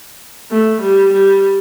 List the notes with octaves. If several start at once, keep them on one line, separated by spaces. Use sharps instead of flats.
A3
G3
G3